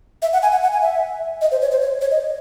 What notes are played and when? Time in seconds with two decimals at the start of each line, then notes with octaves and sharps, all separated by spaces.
0.22 E5
0.33 F#5
0.43 G#5
0.52 F#5
0.63 F#5
0.73 G#5
0.82 E5
1.41 D#5
1.51 C5
1.62 C#5
1.71 C5
1.82 C#5
2.01 C#5
2.11 D#5